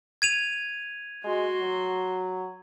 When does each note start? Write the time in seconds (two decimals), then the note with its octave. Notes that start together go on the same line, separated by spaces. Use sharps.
0.22 G#6 D#7 F7
1.24 G#3 F#4 C6
1.61 F#3